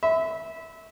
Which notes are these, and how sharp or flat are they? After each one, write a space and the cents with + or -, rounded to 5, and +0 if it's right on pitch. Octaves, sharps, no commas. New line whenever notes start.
E5 -20 B5 +40